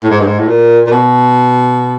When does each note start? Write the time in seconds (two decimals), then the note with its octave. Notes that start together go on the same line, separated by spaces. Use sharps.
0.03 A2
0.11 G#2
0.20 G2
0.27 G#2
0.39 A2
0.48 A#2
0.87 A#2
0.92 B2